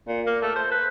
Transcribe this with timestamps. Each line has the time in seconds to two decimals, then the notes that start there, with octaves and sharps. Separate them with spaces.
0.07 A#2
0.26 A#3
0.42 A3
0.56 C5
0.71 B4